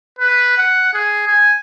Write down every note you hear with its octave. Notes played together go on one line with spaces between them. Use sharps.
B4
F#5
G#4
G#5